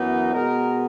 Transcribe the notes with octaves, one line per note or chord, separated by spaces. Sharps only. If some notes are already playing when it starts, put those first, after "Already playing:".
Already playing: F#2 E3 B3 D#4
B2 G#3 B3 A#4